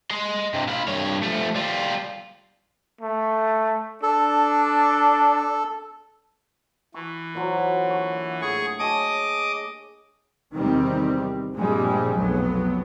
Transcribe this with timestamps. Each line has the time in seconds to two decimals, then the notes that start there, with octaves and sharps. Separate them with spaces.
0.10 D#5 C6
0.54 G2 C3
0.68 F4 B5
0.88 G2 C#5
1.23 F3 A3
1.55 G3 F4
3.01 A3
4.03 D4 A4
6.94 E3 C#6
7.34 A#2 F#3 C5
7.86 D3 C#6
8.42 A2 G#4 C#6
8.79 G#4 C#5 D#5 A5 D6 D#6
10.53 E2 C3 D#3 G3 C4
11.54 G2 A#2 F3 G3 G#3 C4
12.13 F1 B1 F2 F#3 B3